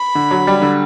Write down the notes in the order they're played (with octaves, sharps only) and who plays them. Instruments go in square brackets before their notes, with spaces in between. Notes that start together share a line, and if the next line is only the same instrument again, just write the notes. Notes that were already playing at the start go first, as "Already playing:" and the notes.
Already playing: [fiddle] B5
[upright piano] D3
F#3
G3
D3